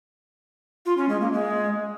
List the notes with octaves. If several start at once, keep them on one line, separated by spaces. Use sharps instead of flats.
F4
C#4
G#3
A#3
G#3